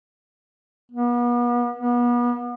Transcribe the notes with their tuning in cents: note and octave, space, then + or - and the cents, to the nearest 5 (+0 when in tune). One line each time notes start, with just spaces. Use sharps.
B3 -40
B3 -35